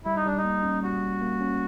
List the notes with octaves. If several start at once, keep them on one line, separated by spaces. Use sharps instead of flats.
G3 E4
D#4
G3 D4
D#4
A#3
C#4
G3 F#4
G3
A#3
C#4